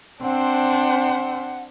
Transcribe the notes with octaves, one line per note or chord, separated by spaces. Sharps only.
C4 D4 C5 F#5